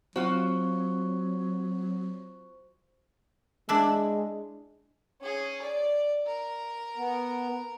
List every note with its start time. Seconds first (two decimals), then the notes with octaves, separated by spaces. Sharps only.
0.16 F#3 C4 F4 F#4 C5 C#6
3.69 G#3 D4 E4
5.21 C#4 G#4
5.62 D5
6.26 A#4
6.97 B3